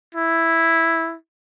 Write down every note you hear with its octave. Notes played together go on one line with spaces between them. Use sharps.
E4